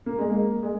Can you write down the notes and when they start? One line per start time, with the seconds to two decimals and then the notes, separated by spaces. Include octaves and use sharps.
0.06 A#3
0.19 G#3
0.30 A#3
0.63 G#3